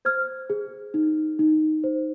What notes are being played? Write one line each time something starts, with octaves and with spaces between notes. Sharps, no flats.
C5 F6 G#6
G#4
D#4
D#4
C5